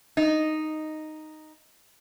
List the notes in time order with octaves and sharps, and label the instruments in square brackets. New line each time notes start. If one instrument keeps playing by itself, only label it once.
[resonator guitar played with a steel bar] D#4 [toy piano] D#5